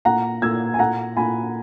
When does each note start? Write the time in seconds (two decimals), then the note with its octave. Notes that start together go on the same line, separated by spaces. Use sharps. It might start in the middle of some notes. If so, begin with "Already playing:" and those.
0.05 A#2 F#5 A#5
0.42 A#2 E6 G#6
0.74 G#5
0.79 A#2 F#5 A#5
1.17 A#2 G#5 B5